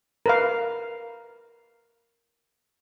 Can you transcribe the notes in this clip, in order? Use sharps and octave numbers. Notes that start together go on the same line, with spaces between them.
A#4 B4 F5